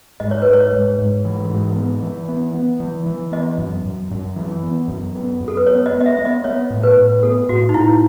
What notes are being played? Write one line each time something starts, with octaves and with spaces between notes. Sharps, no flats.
G#2 D#5
C#5
G#2 B4
C#5
G#2
G#2
E3
G#2
B3
E3
B3
B3
E3
E3
B3 D#5
F#2
F#2
F#2
E3
B3
F#2
B3
F#2
A4
B4
B3 C#5
D#5
B3
D#5
E5
B3 E5
D#5
B3 C#5
A2
B4
A2
B3 A4
A2 F#4
D#4
A2 E4